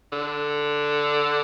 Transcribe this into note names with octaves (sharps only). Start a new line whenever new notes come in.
D3